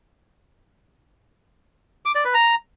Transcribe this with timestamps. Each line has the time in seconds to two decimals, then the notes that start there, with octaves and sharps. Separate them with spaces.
2.06 D6
2.15 D5
2.25 B4
2.34 A#5